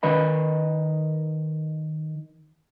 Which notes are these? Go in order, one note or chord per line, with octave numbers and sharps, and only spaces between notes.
D#3 B4 D#5 B5